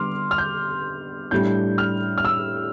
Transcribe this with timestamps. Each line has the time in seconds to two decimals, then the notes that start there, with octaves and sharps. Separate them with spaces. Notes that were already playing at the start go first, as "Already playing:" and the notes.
Already playing: D3 G3 B3 C6 D6 F6
0.31 F6
0.38 G6
1.31 A2 G3 D4 G6
1.78 F6
2.17 F6
2.24 E6